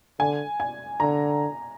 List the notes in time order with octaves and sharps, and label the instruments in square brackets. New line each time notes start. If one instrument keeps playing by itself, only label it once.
[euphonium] D3 [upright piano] G#5
[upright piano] G#5
[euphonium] D3 [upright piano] A#5